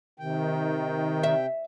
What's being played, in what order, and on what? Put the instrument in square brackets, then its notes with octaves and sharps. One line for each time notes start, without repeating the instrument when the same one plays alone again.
[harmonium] C3 G5 [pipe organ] D#3
[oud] E5